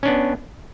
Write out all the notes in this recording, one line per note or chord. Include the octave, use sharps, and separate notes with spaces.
B3 C#4 D4